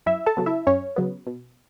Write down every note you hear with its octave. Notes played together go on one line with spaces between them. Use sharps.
F#2 E4 E5
A4 A5
C#3 F#3 B3
E4 E5
F#2 C#4 C#5
C#3 F#3 B3
B2